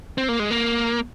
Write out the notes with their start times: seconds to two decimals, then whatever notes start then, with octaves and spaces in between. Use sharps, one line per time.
0.18 C4
0.29 A#3
0.40 G#3
0.51 A#3